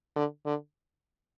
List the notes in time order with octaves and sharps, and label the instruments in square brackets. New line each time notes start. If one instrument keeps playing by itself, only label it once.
[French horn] D3
D3